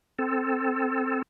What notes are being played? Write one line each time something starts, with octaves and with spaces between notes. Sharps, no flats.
C4 A4